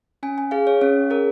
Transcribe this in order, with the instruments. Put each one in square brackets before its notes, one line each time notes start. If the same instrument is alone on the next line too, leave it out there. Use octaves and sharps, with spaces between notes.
[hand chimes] C#4 G#5
G#5
G#4 F5
C#5
C#4 C#5
G#4 A#4